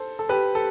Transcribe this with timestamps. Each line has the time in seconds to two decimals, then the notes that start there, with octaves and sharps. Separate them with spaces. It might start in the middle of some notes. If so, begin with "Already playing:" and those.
Already playing: A4 C5
0.19 A4
0.29 G4 B4
0.55 A4